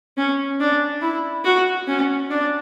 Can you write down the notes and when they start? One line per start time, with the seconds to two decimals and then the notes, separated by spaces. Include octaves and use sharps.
0.18 C#4
0.60 D4
1.02 E4
1.45 F#4
1.88 C#4
2.31 D4